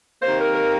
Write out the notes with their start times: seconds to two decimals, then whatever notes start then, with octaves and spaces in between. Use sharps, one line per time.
0.22 C3 D#3 A#3 C5
0.39 A#4
0.55 A#4